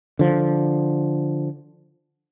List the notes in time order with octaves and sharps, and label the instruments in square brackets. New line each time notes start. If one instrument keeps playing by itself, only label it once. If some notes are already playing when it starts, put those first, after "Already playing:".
[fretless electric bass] D3 F3